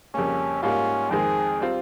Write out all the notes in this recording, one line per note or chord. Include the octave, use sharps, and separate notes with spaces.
F2 C#3 G3 A#3 C#4
G#2 G3 A#3 C#4 F4
F2 D#3 G#3 C4 G#4
G3 C4 F4